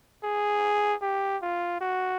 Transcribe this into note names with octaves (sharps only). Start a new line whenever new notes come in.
G#4
G4
F4
F#4